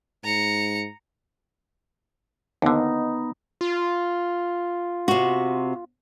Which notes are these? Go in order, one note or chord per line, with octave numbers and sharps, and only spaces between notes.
G#2 A#5 C#7
D#2 D3 B3 D#4
F4
C3 F#4